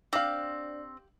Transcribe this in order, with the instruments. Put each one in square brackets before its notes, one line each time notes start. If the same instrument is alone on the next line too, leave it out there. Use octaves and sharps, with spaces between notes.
[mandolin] C4 [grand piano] D4 F#7 [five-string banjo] G4 F5